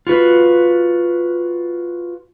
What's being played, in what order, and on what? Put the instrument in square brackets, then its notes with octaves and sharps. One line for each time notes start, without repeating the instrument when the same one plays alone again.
[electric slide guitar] F4 F#4 B4